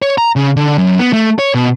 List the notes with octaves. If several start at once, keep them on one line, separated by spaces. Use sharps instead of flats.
C#5
A#5
C#3
D3
F#2
B3
A3
C#5
B2